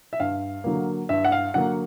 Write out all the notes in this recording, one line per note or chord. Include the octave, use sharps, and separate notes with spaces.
E5
G2 F5
D3 F#3 A#3
G2 E5
F#5
F5
D3 F#3 A#3 F#5